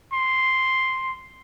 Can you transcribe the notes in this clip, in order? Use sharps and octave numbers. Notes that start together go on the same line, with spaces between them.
C6